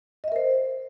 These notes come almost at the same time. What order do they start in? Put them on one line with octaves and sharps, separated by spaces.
D#5 E5 A#4 C5